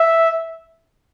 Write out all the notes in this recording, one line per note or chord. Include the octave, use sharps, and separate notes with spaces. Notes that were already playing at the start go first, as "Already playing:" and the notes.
Already playing: E5